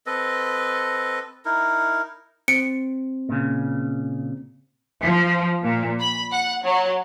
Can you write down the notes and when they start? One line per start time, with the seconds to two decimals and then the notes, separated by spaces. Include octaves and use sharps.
0.06 C4 A4 B4 D#5
1.45 D#4 E4 A#4
2.48 C4 C#7 D7
3.29 A#2 C#3
5.02 F3
5.62 A#2
6.00 B5
6.31 F#5
6.64 F#3